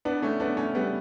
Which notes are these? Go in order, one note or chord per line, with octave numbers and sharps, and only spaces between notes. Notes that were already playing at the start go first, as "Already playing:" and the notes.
B3 D4
A3 C#4
B3 D4
A3 C#4
G3 B3